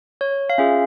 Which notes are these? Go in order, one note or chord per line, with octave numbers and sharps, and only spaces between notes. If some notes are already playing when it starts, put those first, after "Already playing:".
C#5
F5
C#4 F4 G#4 E5